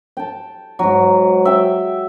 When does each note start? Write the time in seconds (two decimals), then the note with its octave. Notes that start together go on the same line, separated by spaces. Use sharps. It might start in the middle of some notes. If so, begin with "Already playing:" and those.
0.17 G5 A5
0.79 G#2 F#3
1.45 E5 G5